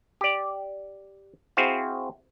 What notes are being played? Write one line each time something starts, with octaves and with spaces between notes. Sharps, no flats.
G4 D5
C4 E4 F#4 G#4 C5 F5